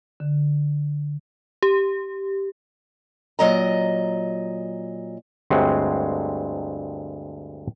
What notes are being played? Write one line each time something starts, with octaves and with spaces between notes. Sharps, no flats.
D3
G4
A#2 F#3 D#5 A#5
D2 G2 G#3 C4 C#5 F#5